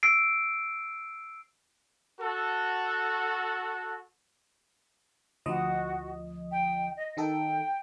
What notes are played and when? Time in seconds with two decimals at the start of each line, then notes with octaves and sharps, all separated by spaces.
0.03 E6 C7 D7
2.20 F#4 A4
5.46 D2 F3 F#4 D#5
6.51 G5
6.96 D#5
7.17 D#3 D#4 A4 G5